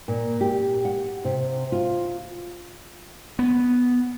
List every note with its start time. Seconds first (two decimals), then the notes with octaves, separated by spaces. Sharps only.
0.08 A#2
0.41 G4
0.85 F#5
1.25 C3
1.72 F4
3.39 B3